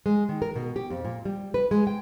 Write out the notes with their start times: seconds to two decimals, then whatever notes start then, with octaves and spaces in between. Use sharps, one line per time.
0.06 G#3
0.29 D#3
0.42 A#4
0.55 B2
0.76 G4
0.90 F2
1.04 A#2
1.25 G3
1.54 B4
1.71 G#3
1.87 G5